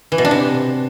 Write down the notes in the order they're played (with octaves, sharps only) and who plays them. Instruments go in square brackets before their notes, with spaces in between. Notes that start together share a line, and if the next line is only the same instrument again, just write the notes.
[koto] E3
B2
D4
C3